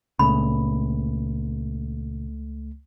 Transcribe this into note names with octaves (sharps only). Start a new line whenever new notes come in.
C#2 A#2 C#3 A3 B5